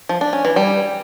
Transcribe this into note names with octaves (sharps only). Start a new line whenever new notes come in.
F3
D4
C#4
E3
G3